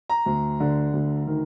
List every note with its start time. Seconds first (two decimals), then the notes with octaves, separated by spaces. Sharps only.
0.09 A#5
0.26 D2
0.60 D3
0.93 D2
1.27 D#3